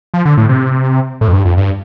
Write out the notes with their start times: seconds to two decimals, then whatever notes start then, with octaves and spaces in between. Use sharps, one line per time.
0.14 F3
0.25 D3
0.37 A2
0.49 C3
1.21 A2
1.28 F2
1.34 G2
1.45 F2
1.57 G2